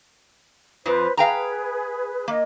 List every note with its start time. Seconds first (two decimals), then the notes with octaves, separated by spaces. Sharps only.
0.86 F2 F3 B4 C5
1.17 G#4 B4 F5 G5 A#5
2.28 A#3 D#5